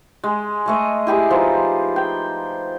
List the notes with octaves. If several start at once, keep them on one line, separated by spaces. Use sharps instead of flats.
G#3
G#3 A3 D#5
E4 G4 G#4 D5
F3 D#4 B4 C5
G5